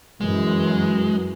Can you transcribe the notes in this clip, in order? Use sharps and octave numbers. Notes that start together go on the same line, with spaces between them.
F#2 E3 F#3 G#3